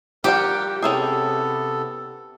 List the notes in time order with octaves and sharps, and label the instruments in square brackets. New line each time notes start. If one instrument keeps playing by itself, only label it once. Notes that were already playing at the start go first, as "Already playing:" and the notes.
[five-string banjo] F3 G3 F#5 [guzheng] G4 [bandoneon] A#4
[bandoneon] C3 B3 A4 [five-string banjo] C#4 E4 G#4